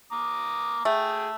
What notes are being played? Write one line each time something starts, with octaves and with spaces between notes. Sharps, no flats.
A#5 D6 D#6
A3 G#4 G5